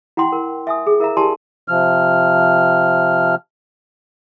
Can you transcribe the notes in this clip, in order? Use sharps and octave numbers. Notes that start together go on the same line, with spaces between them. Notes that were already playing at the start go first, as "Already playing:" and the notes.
E4 F#5 G5 C6
A#4
E5 G#5 D#6
G#4
E4 A#4 E5 F5 A#5
E4 G4 D5 G#5 A5 C6
C3 F3 F6